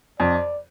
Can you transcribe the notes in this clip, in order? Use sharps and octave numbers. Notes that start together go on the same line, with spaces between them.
F2 D5